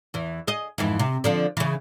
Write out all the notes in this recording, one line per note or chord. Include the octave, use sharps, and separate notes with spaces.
E2 E3
G#4 D#5
F2 G#2 E3
C3
D3 F3 D4
C#3 E3